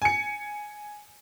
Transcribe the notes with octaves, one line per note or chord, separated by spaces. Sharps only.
G#5 C#7